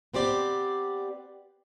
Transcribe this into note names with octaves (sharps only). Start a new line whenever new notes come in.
B3 C4 G4 D5